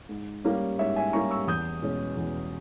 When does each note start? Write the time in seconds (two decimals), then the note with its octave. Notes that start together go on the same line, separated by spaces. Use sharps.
0.09 G#2
0.44 G3 A#3 C#4
0.79 G#2 C#5 E5
0.96 E5 G#5
1.13 G3 A#3 C#4 A#5 C#6
1.30 C#6 E6
1.47 E2 D#6 G6
1.82 B2 G#3 C#4
2.17 E2